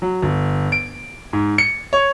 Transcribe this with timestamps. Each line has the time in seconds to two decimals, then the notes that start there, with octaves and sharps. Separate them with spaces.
0.02 F#3
0.22 G1
0.72 D7
1.33 G#2
1.58 C#7
1.93 C#5